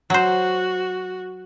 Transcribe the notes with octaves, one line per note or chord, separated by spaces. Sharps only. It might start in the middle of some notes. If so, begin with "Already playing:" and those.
F#3 F#4 C5